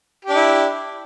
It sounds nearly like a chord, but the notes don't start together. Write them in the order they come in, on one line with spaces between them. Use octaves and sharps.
G4 D4 E4